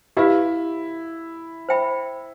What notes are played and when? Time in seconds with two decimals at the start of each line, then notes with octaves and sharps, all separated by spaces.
0.17 E4 G4 B4 F5
1.69 C5 E5 G5 B5